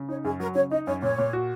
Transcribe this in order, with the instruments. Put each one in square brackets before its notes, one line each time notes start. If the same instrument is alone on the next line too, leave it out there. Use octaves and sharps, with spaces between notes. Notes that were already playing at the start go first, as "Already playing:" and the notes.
Already playing: [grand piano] C#3
[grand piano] D#4 [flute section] C#5
[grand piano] F#2 [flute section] G#4
[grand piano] F#3 [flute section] A#4
[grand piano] C#3 [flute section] C#5
[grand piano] D#4 [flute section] D#5
[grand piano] F#2 [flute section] C#5
[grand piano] A#2 [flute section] C#5
[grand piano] A#2
F#4